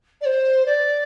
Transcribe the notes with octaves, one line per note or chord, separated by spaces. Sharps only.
D5
C5
D5